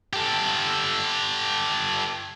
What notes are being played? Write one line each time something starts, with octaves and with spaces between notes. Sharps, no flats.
G4 A4